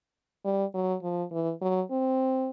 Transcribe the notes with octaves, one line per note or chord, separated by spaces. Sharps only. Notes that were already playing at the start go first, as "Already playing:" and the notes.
G3
F#3
F3
E3
F#3
C4